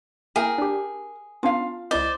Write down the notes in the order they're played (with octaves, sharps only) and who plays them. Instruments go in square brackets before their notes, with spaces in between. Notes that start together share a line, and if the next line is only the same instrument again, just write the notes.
[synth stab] A#3 E4 G5 [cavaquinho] G#4 [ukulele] A#4
[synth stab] D4 G4
[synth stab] B3 C#4 D4 [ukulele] F4 F5
[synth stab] C#2 E4 D#5 [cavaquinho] C5 D5